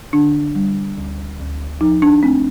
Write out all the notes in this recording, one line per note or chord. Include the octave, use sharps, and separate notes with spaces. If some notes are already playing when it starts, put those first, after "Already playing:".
D3 D4
G3
D2
D2
F3 D#4
D4
A3 C4